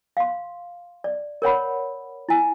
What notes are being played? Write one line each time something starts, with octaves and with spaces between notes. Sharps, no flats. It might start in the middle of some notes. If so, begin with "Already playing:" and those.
F5 C6
D5
A#4 C#5 F#5 B5
E4 G#5